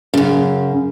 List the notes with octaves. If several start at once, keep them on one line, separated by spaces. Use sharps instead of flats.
F#2 C#3